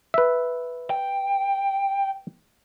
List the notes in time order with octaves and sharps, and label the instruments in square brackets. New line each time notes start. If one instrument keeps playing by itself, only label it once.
[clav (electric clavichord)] B4 E5
[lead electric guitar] G5